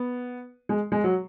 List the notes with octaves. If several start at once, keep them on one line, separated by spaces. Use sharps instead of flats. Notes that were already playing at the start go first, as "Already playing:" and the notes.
Already playing: B3
G#3
G#3
F#3